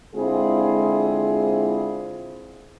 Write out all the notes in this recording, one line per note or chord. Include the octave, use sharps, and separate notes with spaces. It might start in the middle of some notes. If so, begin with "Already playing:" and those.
D3 G#3 C4 E4 F4 G#4